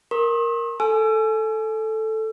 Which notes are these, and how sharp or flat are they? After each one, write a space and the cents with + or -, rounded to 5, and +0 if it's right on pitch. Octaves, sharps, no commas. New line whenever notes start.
A#4 +0 C6 +45 D#6 +0
A4 +0 G#5 +30 E6 +35